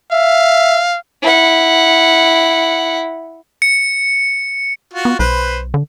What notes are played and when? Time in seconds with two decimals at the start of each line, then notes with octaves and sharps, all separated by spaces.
0.12 E5 F5
1.23 E4 F#5
3.62 C#7
4.94 F4 F#4
5.05 B3
5.19 B1 B4 C5
5.74 D3